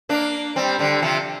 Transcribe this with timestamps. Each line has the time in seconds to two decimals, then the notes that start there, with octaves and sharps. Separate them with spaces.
0.09 A#3 D4
0.56 G3 C4
0.79 D3 G3
1.02 C3 F3